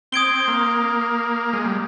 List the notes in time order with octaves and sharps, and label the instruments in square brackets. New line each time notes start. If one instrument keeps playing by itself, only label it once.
[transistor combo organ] C4 [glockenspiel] D#6 G#6 D7 G7
[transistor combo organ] A#3
G#3
G3